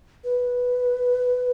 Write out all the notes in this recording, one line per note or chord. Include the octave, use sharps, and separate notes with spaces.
B4